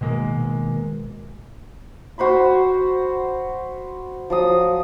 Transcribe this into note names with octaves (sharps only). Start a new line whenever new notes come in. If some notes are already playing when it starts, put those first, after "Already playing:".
B2 D#3 G#3 A#3
F#4 C5 B5 C6
F3 F#3 D#6